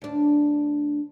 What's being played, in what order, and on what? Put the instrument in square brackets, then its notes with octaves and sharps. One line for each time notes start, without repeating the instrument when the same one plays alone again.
[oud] D2 D4